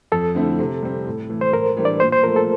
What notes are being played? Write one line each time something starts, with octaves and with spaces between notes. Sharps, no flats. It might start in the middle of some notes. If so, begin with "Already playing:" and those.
F2 A4
D3 A3 C4 E4
C3
G3 C4
A2
E3 A3
C5
A2 A#4
E3 G3 D4
D5
A#2 C5
C5
F3 A3 A#4
A4